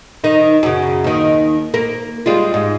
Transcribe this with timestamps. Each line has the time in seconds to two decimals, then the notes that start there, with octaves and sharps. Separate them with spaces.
0.24 D#3 D#4
0.63 F#2 C#3
1.04 D#2 D#3
1.74 A#3
2.26 G3 G#3 F4
2.54 G#2